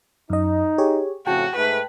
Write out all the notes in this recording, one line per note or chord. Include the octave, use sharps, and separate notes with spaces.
F#2 D#4 D#5
G4 G#4 C#5
F2 A2 C#3 F#4 G5 A5
G#2 A3 B4